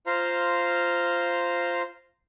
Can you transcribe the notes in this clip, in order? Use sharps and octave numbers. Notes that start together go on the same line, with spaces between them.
F4 C5 F5 A#5 C6